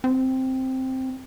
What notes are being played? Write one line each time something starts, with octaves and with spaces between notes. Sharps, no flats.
C4